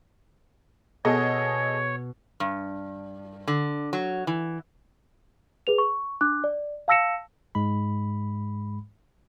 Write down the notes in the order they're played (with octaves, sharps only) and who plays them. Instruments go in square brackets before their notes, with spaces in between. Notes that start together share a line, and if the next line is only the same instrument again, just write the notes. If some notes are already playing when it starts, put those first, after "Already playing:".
[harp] B2 [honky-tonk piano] G#4 A4 D#5 [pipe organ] C#5
[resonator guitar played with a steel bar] G2
D3
F#3
E3
[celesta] G#4 B4 F7
C#6
D4 D6 F#6
D5
F5 A5 E6 A#6 C#7 E7
[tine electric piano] G#2 G#3 B5